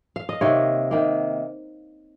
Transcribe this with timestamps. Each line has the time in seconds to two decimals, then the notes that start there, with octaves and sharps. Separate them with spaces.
0.16 F5
0.29 D#5
0.41 C3 D#3 A#3 C#5
0.91 C3 D#3 A#3